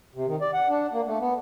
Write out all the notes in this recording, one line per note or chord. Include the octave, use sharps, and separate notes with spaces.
C3
D#3
D5
F#5
D4
A#3
A3
B3